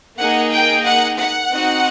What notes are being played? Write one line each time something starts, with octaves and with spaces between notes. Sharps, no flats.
A#3 D#4 G#4 F#5
G5
F#5
F#5
C4 D#4 F#4